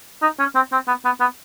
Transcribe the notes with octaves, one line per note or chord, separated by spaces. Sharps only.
D#4
C#4
C4
C4
B3
B3
B3